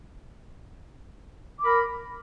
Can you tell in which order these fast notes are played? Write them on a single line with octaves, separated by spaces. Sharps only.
D6 B5 A#4